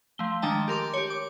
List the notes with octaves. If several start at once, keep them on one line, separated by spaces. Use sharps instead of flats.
F3 A3 G7
D#3 G#3 D4 D#5 G5 A5
G4 A#4 C6 D6
G4 C#5
D6